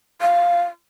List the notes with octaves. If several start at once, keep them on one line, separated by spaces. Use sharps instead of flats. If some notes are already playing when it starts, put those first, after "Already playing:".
F5